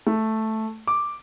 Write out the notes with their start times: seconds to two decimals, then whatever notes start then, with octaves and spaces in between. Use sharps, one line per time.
0.07 A3
0.87 D6